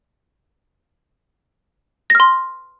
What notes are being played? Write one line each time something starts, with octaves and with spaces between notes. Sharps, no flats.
C6 F6 A#6